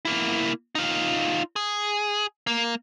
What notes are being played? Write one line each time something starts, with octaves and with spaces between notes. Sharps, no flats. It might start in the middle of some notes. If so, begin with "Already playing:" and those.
A#3 E4
D#4 F4
G#4
A#3